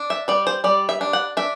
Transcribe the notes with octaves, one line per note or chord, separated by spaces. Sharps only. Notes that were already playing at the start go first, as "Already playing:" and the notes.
Already playing: D4
E5
G3 D5
C5
G3 D5
E5
D4
F#5
D4 E5